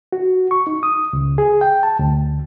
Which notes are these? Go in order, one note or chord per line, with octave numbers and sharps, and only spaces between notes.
F#4
C#6
D#4
D#6
C#2
G#4
G5
A5
D2